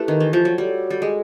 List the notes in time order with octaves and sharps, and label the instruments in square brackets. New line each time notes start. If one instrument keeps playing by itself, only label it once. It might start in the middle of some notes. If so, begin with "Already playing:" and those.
Already playing: [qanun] A3 [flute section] E4 G4 B4
[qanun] D#3
E3
F3
F#3
[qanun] G3 [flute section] F#4 A4 C#5
[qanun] G3
G#3